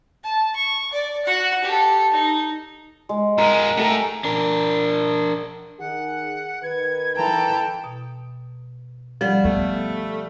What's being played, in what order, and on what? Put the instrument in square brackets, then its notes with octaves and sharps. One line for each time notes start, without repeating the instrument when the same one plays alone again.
[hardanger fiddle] A5
C#6
D5
F#4 F#5
G4 A4
D#4
[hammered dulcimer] G#3
[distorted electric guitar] F2 G#3 [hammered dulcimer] A#4 F#5
[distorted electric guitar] A2 [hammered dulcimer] A3 G#4 A#4
[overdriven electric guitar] D4 A#4
[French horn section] D#3 G#4 [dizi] F#5
[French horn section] D#3 B4 [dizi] G#6
[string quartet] E3 A4 G5 [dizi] A#5
[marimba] B2
[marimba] F3 F#5 G#6 [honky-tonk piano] G3
[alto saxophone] A3 [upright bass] B3